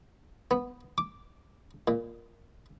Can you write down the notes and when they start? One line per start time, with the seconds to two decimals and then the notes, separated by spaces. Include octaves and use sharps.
0.51 B3
0.98 D6
1.88 A#2